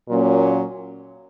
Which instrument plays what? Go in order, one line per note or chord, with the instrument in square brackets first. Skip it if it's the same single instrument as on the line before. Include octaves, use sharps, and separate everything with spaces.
[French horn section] A#2 F#3 A#3 C#4